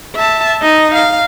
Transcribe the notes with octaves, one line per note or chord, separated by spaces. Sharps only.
E5 A5
D#4 D#5
F5